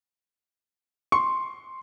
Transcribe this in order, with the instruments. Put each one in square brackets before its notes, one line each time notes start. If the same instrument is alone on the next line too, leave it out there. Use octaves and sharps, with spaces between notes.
[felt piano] C6 [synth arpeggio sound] C#6